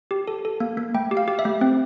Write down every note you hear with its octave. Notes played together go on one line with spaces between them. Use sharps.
G4
A4
A4
A#3
A#3
A3 G5
G4
F5
G4
E5
A3
C4